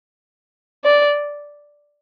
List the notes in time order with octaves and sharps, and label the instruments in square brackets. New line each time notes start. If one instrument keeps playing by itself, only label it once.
[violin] D5